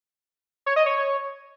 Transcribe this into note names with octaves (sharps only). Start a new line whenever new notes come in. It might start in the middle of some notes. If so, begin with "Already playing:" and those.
C#5
D#5
C#5